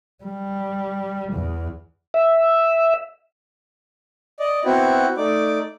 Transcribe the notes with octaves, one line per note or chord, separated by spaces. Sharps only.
G3
E2
E5
D5 D#5
B3 C4 E4 F#4
A3 D#4 D5 D6